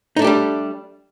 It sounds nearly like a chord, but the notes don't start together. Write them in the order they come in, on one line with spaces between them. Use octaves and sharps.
D#4 A3 D4 G4 G3